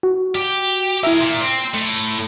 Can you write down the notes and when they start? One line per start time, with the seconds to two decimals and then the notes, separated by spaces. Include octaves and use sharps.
0.03 F#4
0.35 G4
1.03 G#3 E4 A#4 E5
1.20 A#2 C6
1.41 C4
1.74 A2